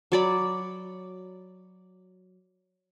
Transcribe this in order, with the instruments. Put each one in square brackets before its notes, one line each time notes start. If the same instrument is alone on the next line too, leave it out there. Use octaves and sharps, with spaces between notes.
[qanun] F#3 D5 B5